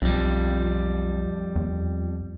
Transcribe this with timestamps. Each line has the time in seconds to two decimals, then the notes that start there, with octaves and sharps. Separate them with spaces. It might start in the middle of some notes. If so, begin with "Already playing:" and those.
0.02 B1 F2 G3
1.56 E2